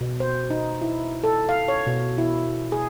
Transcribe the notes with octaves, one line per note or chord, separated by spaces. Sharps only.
B2
C5
D#4
E4
A4
F5
C#5
B2
E4
G#4